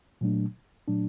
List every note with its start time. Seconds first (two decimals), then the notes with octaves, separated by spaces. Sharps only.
0.21 A#2 F#3 A3 D4
0.88 A#2 F#3 A3 D4